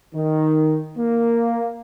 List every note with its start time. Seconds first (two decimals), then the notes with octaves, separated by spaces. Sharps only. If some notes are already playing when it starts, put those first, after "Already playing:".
0.15 D#3
0.98 A#3